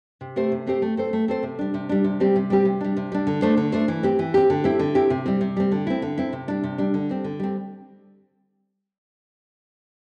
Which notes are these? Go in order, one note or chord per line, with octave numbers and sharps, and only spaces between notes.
C3
A3 C4 G4 C5
C3
A3 C4 G4 C5
A3
C4 A4 C5
A3
C4 A4 C5
C3
G3 D4
C3
G3 D4
C3
G3 C4 G4
C3
G3 C4 G4
C3
G3 D4
C3
G3 D4
D3
A3 D4 C5
D3
A3 D4 C5
E3
C4 G4
E3
C4 G4
D3
C4 E4 G4
D3
C4 E4 G4
C3
G3 C4
C3
G3 C4
D3
C4 E4
D3
C4 E4
C3
G3 D4
C3
G3 D4
D3
G3 C4
D3
G3 C4